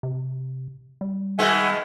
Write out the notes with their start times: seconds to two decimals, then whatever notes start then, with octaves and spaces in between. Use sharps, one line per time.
0.03 C3
1.01 G3
1.39 B2 D#3 G#3 E5 F#5 G#5